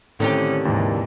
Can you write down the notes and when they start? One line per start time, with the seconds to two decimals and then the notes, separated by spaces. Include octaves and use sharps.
0.20 A2 D3 D#3 C4 C#4 G4
0.65 D#2 G#2 C3 E3